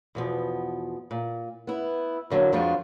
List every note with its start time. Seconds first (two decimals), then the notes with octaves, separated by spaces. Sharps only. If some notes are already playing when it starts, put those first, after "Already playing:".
0.15 E2 B2 F3
1.11 A#2
1.67 B3 E4
2.30 E2 D3 F#3 A#3
2.52 F2 F3 G#3 D4 F4 F#4